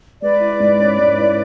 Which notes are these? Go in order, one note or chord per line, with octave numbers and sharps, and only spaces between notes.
G#3 B4 D5
E4
G#2
C#4
G#2
E4